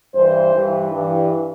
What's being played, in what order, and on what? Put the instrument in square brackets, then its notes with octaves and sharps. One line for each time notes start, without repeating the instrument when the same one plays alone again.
[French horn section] G2 E3 C5
G2 E3
G2 E3